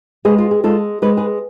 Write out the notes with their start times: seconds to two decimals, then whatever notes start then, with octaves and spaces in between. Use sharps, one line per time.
0.25 G#3 G#4 B4
0.38 F4
0.51 G#4
0.64 G#3 F4 A4
1.02 G#3 B4
1.17 G#4 B4